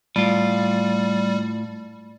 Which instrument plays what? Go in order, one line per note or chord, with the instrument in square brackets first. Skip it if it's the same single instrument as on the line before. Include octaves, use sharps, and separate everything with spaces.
[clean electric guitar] A2 F4 [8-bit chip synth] G3